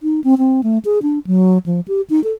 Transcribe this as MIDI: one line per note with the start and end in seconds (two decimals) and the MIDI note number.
0.03 0.20 63
0.24 0.35 60
0.38 0.61 60
0.63 0.78 57
0.85 0.99 68
1.03 1.19 62
1.27 1.58 54
1.66 1.80 53
1.88 2.01 67
2.10 2.22 63
2.24 2.32 69